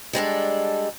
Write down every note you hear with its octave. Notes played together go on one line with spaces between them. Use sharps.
G3 G#3 D4 A4